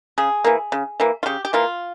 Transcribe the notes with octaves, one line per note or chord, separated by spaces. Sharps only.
C#3 G#4
E3 A#3
C#3
E3 A#3
F4
C#3 G4
G4
E3 A#3 F4